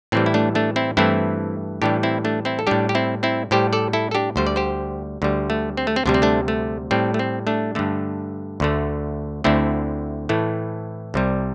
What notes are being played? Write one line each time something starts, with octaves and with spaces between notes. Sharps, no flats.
A2 E3 G3 C4
E4
A3 D4
A3 D4
C4 E4
G2 E3 A3 C4 E4
A2 E3 G3 D4 G4
C4 E4
A3 D4
C4 E4
A4
A2 G3 D4 G4
G4
C4 E4
C4 E4
A2 G3 G4 C5
A4 D5
E4 A4
A4
D4 G4
D2 D3 G3 C5
D5
G4 C5
D2 D3 G3
A3
C4
A3
C4
D2 C3 G3 D4
C4
A3 D4
A3
A2 G3 C4
A3
C4
A3 D4
G2 D3 A3
D2 D3 A3
D2 D3 A3 C4 E4
A2 E3 A3
C2 C3 G3